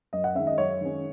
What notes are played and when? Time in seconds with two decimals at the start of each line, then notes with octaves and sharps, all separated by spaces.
0.13 F#2 D#5
0.24 F#5
0.35 D#3 G#3 C#4 E5
0.47 D#5
0.58 F#2 C#5
0.81 D#3 G#3 C#4